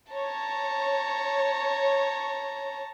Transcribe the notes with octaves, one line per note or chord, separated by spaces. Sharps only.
C#5 A5 A#5